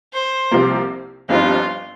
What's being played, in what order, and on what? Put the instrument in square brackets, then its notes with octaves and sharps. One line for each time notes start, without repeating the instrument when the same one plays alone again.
[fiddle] C5
[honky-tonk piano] C2 C3 F3 A#3
[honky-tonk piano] G1 G2 F3 C4 D#4 [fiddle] F4